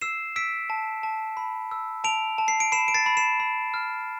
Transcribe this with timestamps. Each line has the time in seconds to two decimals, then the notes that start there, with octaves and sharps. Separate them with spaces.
0.01 E6 C7 E7
0.36 E6 B6 D7
0.70 A5
1.03 A5
1.37 B5
1.71 E6
2.04 A5 D7 F7
2.38 A5
2.48 C7
2.60 D7
2.72 B5 C7 E7
2.88 D7
2.94 A6 C7
3.06 B5
3.17 C7 E7
3.40 B5
3.74 F6